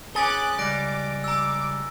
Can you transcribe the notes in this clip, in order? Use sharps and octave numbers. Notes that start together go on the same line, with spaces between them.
C#4 G#4 B4 G#5 D6 F#6 A6 G7
C#2 G3 D6 F#6 A#6 D7
A#5 D6 E6